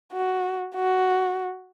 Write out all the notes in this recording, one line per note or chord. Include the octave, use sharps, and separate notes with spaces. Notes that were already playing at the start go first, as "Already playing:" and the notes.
F#4
F#4